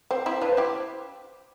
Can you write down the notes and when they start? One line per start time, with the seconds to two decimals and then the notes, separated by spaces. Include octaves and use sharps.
0.11 C4 C5
0.26 C4 E4
0.41 D4 F4 B4
0.52 C5
0.57 E4 G4